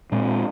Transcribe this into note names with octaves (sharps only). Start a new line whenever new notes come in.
A#2 G#3 C4